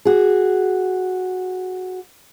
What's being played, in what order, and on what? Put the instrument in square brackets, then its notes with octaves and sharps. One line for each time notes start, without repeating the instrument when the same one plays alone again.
[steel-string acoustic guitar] F#4 G#4